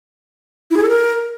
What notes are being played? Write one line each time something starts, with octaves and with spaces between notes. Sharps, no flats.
E4
G#4
A4
A#4